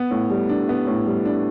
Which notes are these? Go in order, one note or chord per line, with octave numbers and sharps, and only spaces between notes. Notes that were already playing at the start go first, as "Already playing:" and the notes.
Already playing: B3
A2
G3
D4
B3
A2
G3
D4